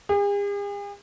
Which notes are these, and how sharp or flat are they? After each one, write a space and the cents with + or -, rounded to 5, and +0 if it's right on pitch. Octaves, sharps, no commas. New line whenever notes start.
G#4 -45